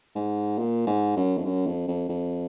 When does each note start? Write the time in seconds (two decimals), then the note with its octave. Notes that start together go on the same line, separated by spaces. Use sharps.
0.15 G#2
0.59 A#2
0.87 G#2
1.16 F#2
1.38 F2
1.45 F#2
1.67 F2
1.88 F2
2.09 F2